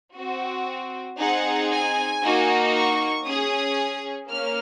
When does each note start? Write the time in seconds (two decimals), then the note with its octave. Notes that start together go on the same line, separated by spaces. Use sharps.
0.16 C4 F#4
1.19 C4 D#4 G#4 F#5
1.71 G#5
2.23 A#3 D#4 F#4
2.74 C#6
3.25 C#4 G#4 D#6
4.29 A#3 C#4 F6